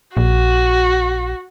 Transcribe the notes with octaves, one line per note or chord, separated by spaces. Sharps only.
A#1 F#4